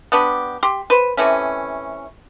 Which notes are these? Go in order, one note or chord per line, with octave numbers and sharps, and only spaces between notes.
B3 D4 G4
G4 C6
B4 C5
C3 E3 A3 C#4